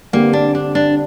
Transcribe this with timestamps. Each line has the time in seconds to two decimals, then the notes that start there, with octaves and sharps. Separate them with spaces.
0.13 D3 G3 A#3 C4 G4
0.33 D4
0.55 D4
0.75 D4